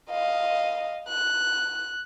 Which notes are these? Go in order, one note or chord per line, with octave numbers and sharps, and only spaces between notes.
D#5 F5
F#6